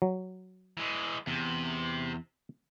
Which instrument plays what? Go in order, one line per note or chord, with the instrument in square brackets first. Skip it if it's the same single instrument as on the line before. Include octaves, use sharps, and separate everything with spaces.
[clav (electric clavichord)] F#3
[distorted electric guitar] E3 G#3
[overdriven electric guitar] E2 [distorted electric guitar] C3